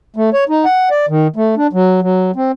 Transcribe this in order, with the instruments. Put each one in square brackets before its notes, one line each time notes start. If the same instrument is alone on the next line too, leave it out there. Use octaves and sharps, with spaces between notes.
[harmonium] A3
C#5
D#4
F#5
D5
D#3
A3
D4
F#3
F#3
C4